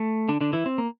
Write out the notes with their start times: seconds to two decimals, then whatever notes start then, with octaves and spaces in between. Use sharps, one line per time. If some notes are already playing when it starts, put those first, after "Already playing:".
Already playing: A3
0.28 D3 D4
0.41 D3 D4
0.53 E3 E4
0.66 C4
0.78 A#3